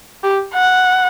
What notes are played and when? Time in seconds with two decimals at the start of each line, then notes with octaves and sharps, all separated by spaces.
0.24 G4
0.54 F#5